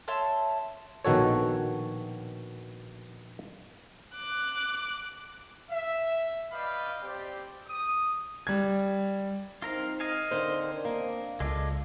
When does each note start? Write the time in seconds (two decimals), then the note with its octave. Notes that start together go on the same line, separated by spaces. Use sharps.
0.08 C#5 E5 A5 C6
1.05 A#1 B2 D#3 F#4 A4 C#5
4.14 D6 F#6
5.70 E5
6.51 B4 D5 D#5 F5 G5 B5
7.02 C4 G4 D5
7.67 D#6
8.47 G3 G#6
9.62 C4 D#4 F4 A#4 F5
10.00 D#5 F5 G#5
10.31 D3 D#3 C4 D4 A#4 C5
10.85 A#3
11.40 C#2 G#3 F4 A4 D5